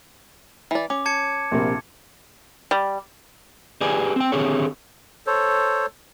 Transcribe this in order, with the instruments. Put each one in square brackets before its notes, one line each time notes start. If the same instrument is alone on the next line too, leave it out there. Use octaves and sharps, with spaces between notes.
[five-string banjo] E3 D5
[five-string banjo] C#4 [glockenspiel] D6
[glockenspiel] A5 G#6 C#7
[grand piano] A#1 C3 A#3
[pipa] G3
[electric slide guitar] G4 G#4 B4 D5 G#5
C4 G5
D3 D#3 C4 G4 G#4 C#5
[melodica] A4 C5 C#5